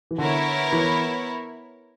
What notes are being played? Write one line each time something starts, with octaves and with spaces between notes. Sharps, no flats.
E3
D3 B3 E4 A#4 C#5
E3